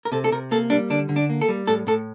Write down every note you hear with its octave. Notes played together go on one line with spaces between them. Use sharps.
A#4
C3 A4
A4
C3 A#4
A#3 A4
G3 D4
D3 D4
D3
D4
A#3
A4
G3
A2 A4
A2 A4